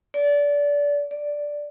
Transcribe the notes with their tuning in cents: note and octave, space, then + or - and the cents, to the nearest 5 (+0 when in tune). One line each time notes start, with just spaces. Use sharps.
D5 -25
D5 -5